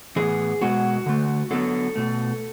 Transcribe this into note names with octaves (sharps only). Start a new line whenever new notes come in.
A2 E3 B3 G#4
B2 G#3 B3 F#4
D3 A3
D3 F#3 B3 A4
B2 A3